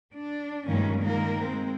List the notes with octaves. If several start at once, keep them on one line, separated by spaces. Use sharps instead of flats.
D4
G2 A#2 D#3 G#3 A#3 C#4
D#3 G#3 A#3 A#4
G#3 C4